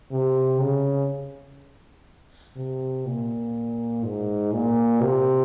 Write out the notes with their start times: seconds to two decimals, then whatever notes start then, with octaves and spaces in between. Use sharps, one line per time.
0.11 C3
0.60 C#3
2.56 C3
3.05 A#2
4.04 G#2
4.53 A#2
5.01 C3